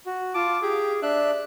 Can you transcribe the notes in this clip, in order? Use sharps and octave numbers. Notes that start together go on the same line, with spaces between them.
F#4
F4 A5 D6
G4 G#4
D4 E5 F#6